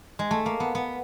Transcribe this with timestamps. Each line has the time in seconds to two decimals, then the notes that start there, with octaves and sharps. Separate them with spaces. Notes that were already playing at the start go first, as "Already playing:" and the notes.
0.19 G#3
0.31 A3
0.46 A#3
0.60 B3
0.75 B3